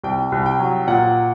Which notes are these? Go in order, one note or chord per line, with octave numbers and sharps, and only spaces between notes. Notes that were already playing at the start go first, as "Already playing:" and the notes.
C2 G5
C2
G5
F#3
A#2 F#5